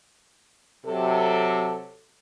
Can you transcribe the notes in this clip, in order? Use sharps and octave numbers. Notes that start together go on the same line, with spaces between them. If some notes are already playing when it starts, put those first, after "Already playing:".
C3 F#3 A4